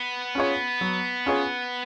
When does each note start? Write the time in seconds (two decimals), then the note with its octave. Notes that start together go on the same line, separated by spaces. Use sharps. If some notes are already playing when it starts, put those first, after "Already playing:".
Already playing: B3
0.35 C#4 F4 G#4 C#5
0.81 F#3
1.26 C#4 F4 G#4 C#5